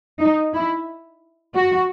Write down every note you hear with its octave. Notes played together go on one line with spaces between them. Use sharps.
D#4
E4
F#4